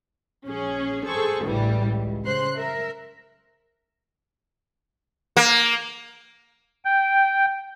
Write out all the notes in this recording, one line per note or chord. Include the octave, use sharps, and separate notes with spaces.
A#1 C#4 G#4
G#4 A4 C5 C#6
A1 D2 A2 C#3 E3 G3
C#2
C#3 C5 C6 F#6 C7
A#4 E5
A#3
G5